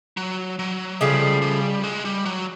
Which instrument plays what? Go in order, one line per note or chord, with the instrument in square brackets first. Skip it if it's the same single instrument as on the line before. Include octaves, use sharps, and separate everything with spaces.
[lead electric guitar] F#3
F#3
[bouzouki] C#3 F3 A3 [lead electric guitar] G3
[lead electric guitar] G3
G#3
G3
F#3